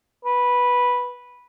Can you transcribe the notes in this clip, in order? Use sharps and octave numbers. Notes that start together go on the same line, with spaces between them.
B4